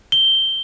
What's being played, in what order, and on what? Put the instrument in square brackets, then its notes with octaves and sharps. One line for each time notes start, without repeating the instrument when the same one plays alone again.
[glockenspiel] G7